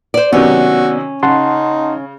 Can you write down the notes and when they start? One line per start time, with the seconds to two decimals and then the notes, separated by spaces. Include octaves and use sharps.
0.14 C5 D5
0.33 C3 D#3 F#3 B3 C#4 F#4 D5
1.23 C#3 D#4 F#5 A5 C6